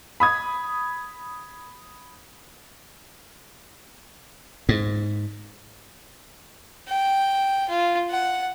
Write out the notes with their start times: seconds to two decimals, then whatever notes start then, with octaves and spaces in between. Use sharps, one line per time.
0.20 B5 D#6 G#6
4.69 G#2
6.88 G5
7.69 F4
8.10 F#5